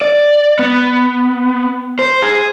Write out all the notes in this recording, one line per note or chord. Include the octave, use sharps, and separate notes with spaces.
D5
B3
C5
G#4